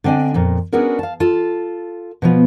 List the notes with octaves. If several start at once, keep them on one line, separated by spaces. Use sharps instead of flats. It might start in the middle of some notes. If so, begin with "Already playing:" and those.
D3 C4 D4 D#5 G#5
F2 A#2
B3 C#4 D4 F#4 G#4 A#4
F5 A5
F4 A4 A5
B2 F3 B3